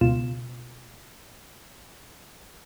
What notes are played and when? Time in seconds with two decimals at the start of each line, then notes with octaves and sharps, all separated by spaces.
0.01 C#2 B2 F4 E7